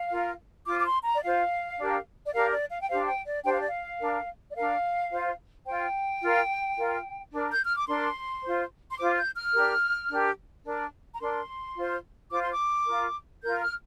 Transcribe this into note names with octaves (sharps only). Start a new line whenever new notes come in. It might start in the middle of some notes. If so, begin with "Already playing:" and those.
Already playing: F5
F4 A#4
F4 C5 D6
D6
C6
A#5
D5
F4 C5 F5
D4 G4 A#4
D5
D4 G4 A#4 F5
D5
F5
G5
D4 G4 C5 F5
G5
D5
D4 G4 C5 G5
F5
D5
F5
D4 A#4
D5
D4 A#4 F5
F4 C5
F4 C5 G5
F4 A#4
F4 A#4
D4 A#4
G6
F6
D6
D4 A#4 C6
F4 C5
C6
F4 C5 D6
G6
F6
D4 G4 A#4
D4 G4 A#4
D4 A#4
A#5
D4 A#4 C6
F4 C5
F4 C5 D6
C6
D6
F4 A#4
F4 A#4 G6
F6